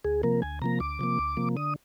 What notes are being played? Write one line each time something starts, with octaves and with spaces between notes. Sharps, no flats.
D2 G#4
C3 F3 A#3 A#4
D2 G#5
C3 F3 A#3 A#5
D2 D6
C3 F3 A#3
D2
C3 F3 A#3
D3 D#6